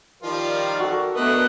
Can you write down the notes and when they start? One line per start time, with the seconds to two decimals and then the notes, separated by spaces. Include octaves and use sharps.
0.23 D#3 F3 G3 F4 A#4 D5
0.80 F#4 A4
1.15 A3 B3 D4 A#4 B4 D#5